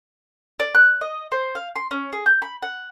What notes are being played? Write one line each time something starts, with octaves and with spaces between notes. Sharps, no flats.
D5
F#6
D#5
C5
F5
C6
C#4
G#4
G6
B5
F#5